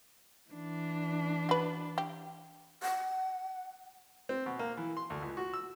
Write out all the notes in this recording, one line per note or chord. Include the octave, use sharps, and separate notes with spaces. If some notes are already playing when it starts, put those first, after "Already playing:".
E3 D4
F#4 B4
G4
F#5
C4
B2
A#3
E3
C6
D2
C#2
F#4
E6